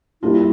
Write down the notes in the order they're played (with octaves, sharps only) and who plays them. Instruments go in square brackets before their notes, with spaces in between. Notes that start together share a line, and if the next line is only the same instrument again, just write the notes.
[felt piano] G3 A#3 D4 F4 [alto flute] E4